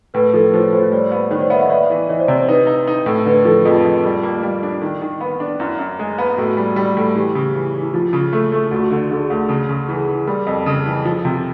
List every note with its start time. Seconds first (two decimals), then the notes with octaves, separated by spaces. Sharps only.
0.14 A2 B4
0.24 A#4
0.34 F3 A4
0.43 A#4
0.54 F3 C5
0.62 C#5
0.73 A2 C5
0.83 C#5
0.92 G3 C5 D5
1.12 B3
1.31 D#3 C#5
1.40 C5 D5
1.50 B3 E5 F#5
1.60 D#5 F5
1.70 B3 D5 E5
1.90 E3
2.09 E3 C#5 D#5
2.19 C5 D5
2.28 C3 C#5
2.39 C5
2.48 D#4 B4
2.67 D#4
2.87 D#4
3.06 A2
3.26 D3 B4
3.36 A#4
3.45 F3 A4
3.55 G#4
3.65 F2 F4
3.84 F2
4.04 G3
4.23 A#3
4.43 G3
4.63 D4
4.82 D#3
5.01 D#3
5.21 B3
5.40 D4
5.60 F#2 E4
5.79 F#2
5.99 G#3
6.18 B3
6.37 A2 F#4
6.57 G3
6.76 G3
6.97 A2
7.15 E3 G4
7.35 C#3
7.54 E3 E4
7.74 E3
7.82 E4
7.93 F3 F4
8.13 C#3
8.33 A3
8.52 A3
8.71 D2 F#4
8.91 D3
9.11 D3 G#4
9.30 D2
9.49 C#3
9.69 C#3
9.88 E3 G#4
10.07 E3
10.27 G3 A#4
10.47 F2
10.66 C#3
10.86 E3
11.05 F3
11.25 C3